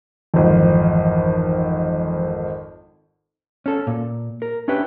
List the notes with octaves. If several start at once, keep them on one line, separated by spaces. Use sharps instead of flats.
G#1 F2 E3 F3
C#4 A4
A#2
A#4
C#4 D4 E4 G4 B4 C#5